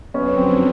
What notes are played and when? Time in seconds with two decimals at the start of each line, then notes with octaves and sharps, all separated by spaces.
0.14 F2 D3 F#3 B3 C#4
0.37 C4